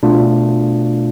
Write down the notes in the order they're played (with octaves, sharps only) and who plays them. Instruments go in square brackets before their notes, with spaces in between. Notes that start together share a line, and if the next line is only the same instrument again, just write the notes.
[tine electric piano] B2 A3 D4 F4